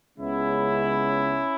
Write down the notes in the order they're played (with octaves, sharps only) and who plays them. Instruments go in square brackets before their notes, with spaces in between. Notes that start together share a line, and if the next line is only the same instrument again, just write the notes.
[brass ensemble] C#2 C#3 G#3 B3 C#4 E4